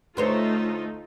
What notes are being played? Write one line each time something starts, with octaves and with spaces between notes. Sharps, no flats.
D2 A3 D#4 F4 C5 C#5